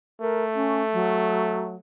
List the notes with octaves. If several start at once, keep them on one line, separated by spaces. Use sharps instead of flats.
A3 A#4
C#4
F#3